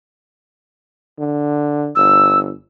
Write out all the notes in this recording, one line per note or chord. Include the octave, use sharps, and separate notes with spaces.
D3
G1 E6